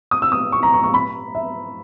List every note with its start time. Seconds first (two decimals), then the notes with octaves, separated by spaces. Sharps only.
0.11 D#6
0.22 E6
0.32 D#6
0.52 C#6
0.63 A#5
0.73 C#6
0.83 C#6
0.94 B5
1.35 E5